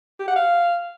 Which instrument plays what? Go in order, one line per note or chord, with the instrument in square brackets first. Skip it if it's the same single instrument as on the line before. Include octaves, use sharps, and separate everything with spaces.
[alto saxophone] G4
F#5
F5